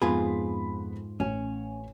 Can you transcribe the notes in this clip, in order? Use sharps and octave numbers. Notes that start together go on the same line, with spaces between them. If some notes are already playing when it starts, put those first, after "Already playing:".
F2 G#2 B3 F4 G#4 B5
A1 C#4 G#5